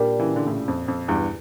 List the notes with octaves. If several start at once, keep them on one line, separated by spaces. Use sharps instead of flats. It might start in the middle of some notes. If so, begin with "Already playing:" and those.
Already playing: A#2 G3 D4 G4
C#3 E3
D3
A2 C#3
F2
F2
E2 G2